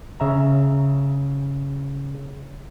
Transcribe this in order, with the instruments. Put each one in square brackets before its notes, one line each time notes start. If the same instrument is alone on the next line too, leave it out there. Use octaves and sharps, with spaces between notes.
[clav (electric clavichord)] C#3 E5 A#5